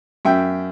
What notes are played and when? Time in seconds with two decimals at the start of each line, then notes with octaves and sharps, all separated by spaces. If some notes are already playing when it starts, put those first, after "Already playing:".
0.25 F#2 E5 G5